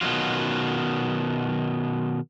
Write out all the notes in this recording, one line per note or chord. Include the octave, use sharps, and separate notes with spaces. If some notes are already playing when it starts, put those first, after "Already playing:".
B2 D#3 E3 F#3 F4